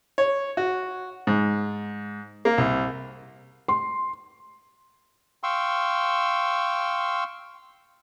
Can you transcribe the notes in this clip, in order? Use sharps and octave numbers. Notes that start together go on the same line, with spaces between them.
C#5
F#4
G#2
A#3
C2
C6
F5 G5 C6 C#6 E6